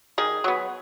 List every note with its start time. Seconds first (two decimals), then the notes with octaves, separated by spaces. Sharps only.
0.18 D#3 G#4
0.44 F#3 B3